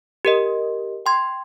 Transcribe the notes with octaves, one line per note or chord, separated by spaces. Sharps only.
G4 A#4 D#5
G5 C6 G#6